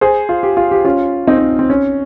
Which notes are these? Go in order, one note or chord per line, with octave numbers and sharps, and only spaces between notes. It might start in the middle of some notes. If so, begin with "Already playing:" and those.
G#4 C5
F4
G4
F4
G4
C#4 F4
C4 D#4
C4
C4
C#4